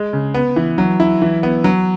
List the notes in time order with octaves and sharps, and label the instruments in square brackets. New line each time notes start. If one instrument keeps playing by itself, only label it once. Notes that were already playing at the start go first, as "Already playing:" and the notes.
Already playing: [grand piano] G#3
C#3
B3
E3
F#3
E4
E3
B3
F#3